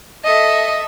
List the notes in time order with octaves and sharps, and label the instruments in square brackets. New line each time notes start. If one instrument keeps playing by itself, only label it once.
[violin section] A4 E5 [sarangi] D#5